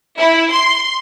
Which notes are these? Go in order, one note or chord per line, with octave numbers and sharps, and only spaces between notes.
E4
C6